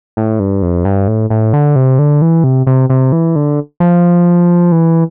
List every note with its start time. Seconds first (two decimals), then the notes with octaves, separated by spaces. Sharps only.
0.17 A2
0.40 G2
0.62 F2
0.85 G2
1.08 A2
1.30 A2
1.53 D3
1.76 C3
1.99 D3
2.22 E3
2.44 C3
2.67 C3
2.90 C3
3.12 E3
3.36 D3
3.80 F3
4.72 E3